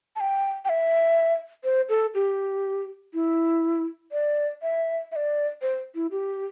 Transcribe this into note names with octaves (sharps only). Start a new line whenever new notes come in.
A5
G5
G5
E5
C5
A4
G4
E4
D5
E5
E5
D5
C5
E4
G4